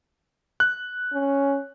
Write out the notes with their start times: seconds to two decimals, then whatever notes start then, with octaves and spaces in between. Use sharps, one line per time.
0.60 F#6
1.13 C#4